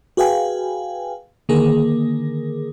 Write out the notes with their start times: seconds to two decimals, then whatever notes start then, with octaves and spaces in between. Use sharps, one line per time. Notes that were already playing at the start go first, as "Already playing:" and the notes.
0.17 F#4 G#4 B4 F5 G5 G#5
1.49 D3 D#3 A#3 G#4 A#4